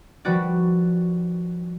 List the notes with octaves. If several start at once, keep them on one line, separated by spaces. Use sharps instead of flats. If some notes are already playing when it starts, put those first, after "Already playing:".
D#3 F3 G3 F#4 B4 D5